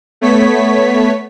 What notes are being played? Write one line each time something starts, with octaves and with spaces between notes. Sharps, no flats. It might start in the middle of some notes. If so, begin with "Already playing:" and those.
A3 B3 C#5 B6